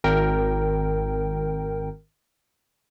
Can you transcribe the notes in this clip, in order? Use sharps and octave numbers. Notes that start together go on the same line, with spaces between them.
G#1 A#4 G5